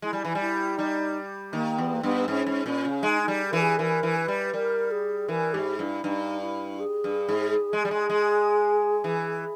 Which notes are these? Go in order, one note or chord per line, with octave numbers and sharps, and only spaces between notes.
G#3 E4
G3
E3
G3
E4
G3 D#4
D#3 A#3
E2 B3
A#3
G2 B3
G#2 C#4
G#2
A#2 C#4
C#3
G#3 D#4
D#4
G3
E3 A#4
G#4
E3 A#4
E3
B4
G3
G3 A#4
G#4
E3 A#4
G#2 G4
G2 E4
G2 D#4
E4
G#4
G2
G#2
G#3
G3
G#3
G#3
E3